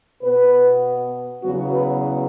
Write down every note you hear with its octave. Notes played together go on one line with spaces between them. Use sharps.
B2 B3 B4
E2 C#3 F#3 B3 F#4
B4